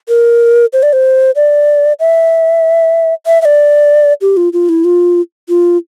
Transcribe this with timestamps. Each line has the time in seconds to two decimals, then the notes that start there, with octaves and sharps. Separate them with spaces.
0.08 A#4
0.73 C5
0.83 D5
0.93 C5
1.36 D5
2.00 E5
3.26 E5
3.42 E5
3.45 D5
4.21 G4
4.37 F4
4.53 F4
4.69 E4
4.84 F4
5.49 F4